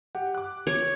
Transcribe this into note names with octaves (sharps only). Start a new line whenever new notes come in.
G4 F#5
D6 F#6
C#5